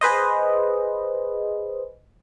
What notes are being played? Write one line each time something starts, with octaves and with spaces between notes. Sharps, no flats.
G#4 B4 C5 D#5